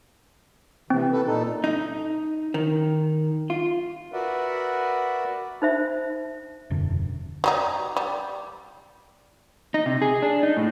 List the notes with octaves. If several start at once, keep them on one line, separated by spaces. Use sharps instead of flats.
C3 E3 C4
A4 B4
A#2 D#4 A4
D#4
D#3
F4
F#4 A#4 B4 D5 E5 F#5
D#4 C5 E5
E1 F#2 D3
F#3 G3 D#4
G3
D#4
C3
G#4
D4
D#4
A2